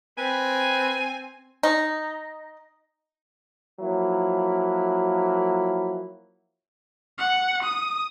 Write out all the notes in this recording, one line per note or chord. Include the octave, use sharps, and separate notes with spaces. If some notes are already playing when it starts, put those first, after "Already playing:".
C4 B4 G#5
D#4
F3 F#3 A#3 E4
F#5
D#6